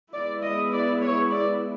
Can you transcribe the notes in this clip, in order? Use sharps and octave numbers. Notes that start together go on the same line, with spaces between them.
G#3 B3 E4 D5
D#5
D5
C#5
D5